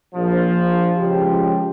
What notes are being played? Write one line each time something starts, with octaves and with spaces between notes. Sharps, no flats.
A#1 F3
C#2 F3 G4